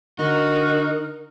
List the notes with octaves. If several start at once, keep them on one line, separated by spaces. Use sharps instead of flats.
D3 D#4 F#4 A#4